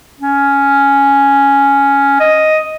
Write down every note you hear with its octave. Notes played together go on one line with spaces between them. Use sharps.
C#4
D#5